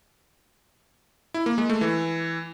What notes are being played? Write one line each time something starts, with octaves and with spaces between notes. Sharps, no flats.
E4
A#3
G#3
A3
E3